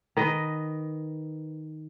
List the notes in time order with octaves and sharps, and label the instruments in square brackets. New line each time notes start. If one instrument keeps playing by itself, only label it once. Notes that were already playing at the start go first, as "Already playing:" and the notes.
[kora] D#3 B4 D#5